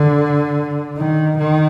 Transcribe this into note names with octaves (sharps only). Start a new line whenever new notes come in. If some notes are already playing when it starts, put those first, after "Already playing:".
Already playing: D3
D#3
D#3